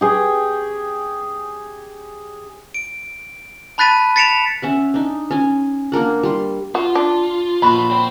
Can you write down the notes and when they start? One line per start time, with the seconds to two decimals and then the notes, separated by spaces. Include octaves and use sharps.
0.01 G4 G#4 C#5
2.74 D7
3.78 A5 B5 F#6 A6 B6 D#7
4.16 A6 B6 C#7 D7 E7 F7
4.62 C#4 E5 F#5
4.94 D4 D#4
5.31 C#4 G#5
5.92 A#3 D4 A#4 F#5
6.23 G3 C6
6.75 F4 F#4
6.95 D4
7.62 A#1 F#4 A5 B5
7.90 C5 G5